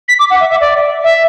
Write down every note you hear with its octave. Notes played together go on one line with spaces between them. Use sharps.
B6
D6
F#5
E5
E5
D5
E5